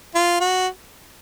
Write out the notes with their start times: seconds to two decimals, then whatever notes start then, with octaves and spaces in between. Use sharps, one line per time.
0.15 F4
0.40 F#4